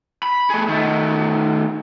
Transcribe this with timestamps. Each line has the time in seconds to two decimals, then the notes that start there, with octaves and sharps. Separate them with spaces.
0.23 B5
0.50 A3 G#4
0.68 D#3 A3